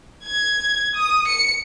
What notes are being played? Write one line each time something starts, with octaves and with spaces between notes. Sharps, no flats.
G#6
D#6
C#7